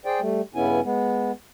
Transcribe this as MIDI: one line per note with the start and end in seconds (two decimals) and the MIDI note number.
0.05 0.20 68
0.05 0.20 72
0.05 0.20 74
0.05 0.20 79
0.20 0.41 55
0.20 0.41 57
0.55 0.80 43
0.55 0.80 49
0.55 0.80 59
0.55 0.80 61
0.55 0.80 64
0.55 0.80 80
0.85 1.32 56
0.85 1.32 59